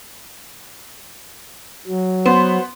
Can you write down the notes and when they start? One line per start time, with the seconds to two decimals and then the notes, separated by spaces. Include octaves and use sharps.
1.87 F#3
2.25 B3 C5